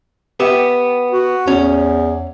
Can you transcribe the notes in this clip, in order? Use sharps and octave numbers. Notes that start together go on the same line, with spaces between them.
B3 G4 E5
F#4
E2 C#4